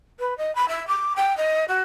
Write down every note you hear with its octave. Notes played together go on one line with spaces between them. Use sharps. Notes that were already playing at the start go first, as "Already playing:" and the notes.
B4
D#5
B5
E5
D6
G5
D#5
F#4